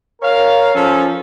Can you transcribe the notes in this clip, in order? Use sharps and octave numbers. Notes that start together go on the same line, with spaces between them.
A#4 C#5 F5
F3 C#4 A4